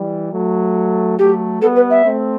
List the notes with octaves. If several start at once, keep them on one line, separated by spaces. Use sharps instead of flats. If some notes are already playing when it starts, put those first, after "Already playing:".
Already playing: E3 G3
F#3 A3
F#3 A3 G4
G3 B3 A4
B4
E5
A3 C4